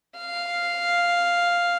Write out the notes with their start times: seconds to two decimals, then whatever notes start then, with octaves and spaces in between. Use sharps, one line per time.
0.18 F5